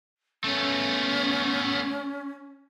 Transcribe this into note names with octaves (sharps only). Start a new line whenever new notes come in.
A3 B3 C#4